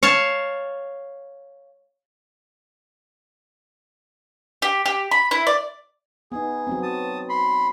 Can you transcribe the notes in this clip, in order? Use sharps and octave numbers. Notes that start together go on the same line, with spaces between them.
C#5 F5 A5
G4
G4
B5
E4
D5
B3 D#4 G#4
F#3 B3 C4
A5 D#6
B5 C6